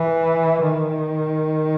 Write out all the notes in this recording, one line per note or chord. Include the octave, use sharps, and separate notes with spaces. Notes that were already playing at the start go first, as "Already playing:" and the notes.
Already playing: E3
D#3